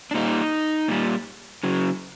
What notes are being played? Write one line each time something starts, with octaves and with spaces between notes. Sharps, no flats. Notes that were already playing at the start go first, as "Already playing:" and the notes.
D4
A#2 G3 D#4
A#2 G3
C#3 F#3